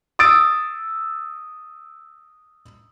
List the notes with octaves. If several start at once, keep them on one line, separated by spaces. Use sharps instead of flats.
D#6 E6 A6 D7